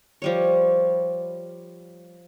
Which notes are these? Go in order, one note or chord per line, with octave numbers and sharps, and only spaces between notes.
F3 G3 C#5